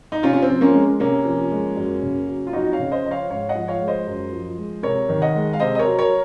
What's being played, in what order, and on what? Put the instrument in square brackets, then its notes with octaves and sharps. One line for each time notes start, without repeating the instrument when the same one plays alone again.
[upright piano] D#4
C3 C#4 F4
C#4
C4
F3
A#3 C#4
G#3
C3 A#3 C#4
F3
G#3
F#2
C#3
F#3
F4
F2 D#4 F#4
C#5 F5
C#3
C5 D#5
F3 D#5
C#5 F5
G#2 C#5 F5
D#5 F#5
F3
C#5 F5
G#3
C5 D#5
F#2
F3
G#3
C3 A#4 C#5
D#3
D#5 F#5
G#3
F5
C3 C5 D#5
D#5
A#4 C#5
F#3
A#4 C#5